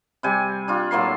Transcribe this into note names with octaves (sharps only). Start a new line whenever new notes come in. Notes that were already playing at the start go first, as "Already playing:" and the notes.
C3 G3 G#5
D4 F4
A2 F#3 A#3 C6